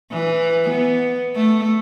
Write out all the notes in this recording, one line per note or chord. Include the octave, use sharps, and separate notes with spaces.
E3
B3
A3